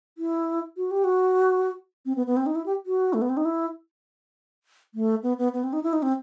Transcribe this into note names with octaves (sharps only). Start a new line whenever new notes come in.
E4
F#4
G4
F#4
C4
B3
B3
C4
D#4
E4
G4
F#4
A3
B3
C4
D#4
E4
A3
B3
B3
B3
C4
D#4
E4
D#4
C4